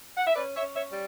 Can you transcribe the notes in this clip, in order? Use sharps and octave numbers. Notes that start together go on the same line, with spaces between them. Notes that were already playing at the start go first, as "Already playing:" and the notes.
F#5
E5
C#4 B4 D5
C#5 E5
C#4
C#5 E5
G3